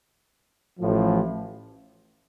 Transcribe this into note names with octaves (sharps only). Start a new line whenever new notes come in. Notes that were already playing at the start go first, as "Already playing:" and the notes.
A1 A2 F3